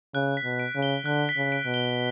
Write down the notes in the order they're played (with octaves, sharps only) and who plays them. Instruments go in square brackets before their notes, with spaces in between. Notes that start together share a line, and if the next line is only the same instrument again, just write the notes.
[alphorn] C#3 [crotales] F#6
[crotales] B6
[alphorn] B2
[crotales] D7
[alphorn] C#3
[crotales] G7
[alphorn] D3 [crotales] F#6
[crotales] B6
[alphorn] C#3
[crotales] D7
[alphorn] B2
[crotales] G7